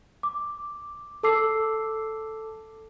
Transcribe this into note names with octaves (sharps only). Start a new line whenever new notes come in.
D6
A4 A5 D6 E6 C7